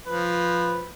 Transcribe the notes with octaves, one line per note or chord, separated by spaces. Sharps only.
F3 B4